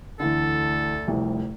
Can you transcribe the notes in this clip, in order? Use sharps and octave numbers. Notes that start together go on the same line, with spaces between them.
D2 D3 E3 A4
F1 C2